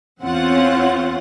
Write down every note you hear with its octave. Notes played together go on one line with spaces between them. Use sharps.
E2 C4 C#4 F4 F#5